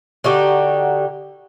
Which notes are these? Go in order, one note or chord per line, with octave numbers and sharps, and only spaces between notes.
D3 D#4 F#4 G4